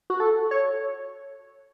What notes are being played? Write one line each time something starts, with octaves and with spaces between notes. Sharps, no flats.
F#4
A4
C#5